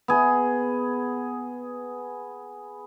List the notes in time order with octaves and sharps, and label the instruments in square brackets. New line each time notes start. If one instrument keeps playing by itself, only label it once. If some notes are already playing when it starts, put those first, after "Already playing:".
[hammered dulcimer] B3 G#4